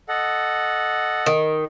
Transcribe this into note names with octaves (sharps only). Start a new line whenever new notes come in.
A4 D#5 F#5
D#3